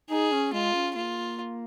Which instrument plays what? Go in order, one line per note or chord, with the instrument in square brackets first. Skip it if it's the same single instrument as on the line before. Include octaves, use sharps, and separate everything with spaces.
[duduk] D#4 [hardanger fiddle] G#4
[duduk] C#4
[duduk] G#3 [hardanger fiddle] F4
[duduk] C#4
[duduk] A#3 [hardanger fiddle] F4